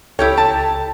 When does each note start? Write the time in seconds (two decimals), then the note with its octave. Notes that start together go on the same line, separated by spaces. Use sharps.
0.19 C#2 E4 G4 A4 C#5 G5
0.38 A5